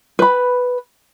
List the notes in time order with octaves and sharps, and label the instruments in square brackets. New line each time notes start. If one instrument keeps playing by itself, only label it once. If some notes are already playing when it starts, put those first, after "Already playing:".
[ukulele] B4 B5